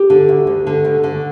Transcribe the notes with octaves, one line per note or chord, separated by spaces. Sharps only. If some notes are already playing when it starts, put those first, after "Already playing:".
Already playing: G4
D3
D2
D2
D3
D2
D3